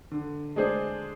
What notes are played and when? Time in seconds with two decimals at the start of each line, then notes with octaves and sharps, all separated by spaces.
0.11 D3
0.56 G#3 D4 G#4 C5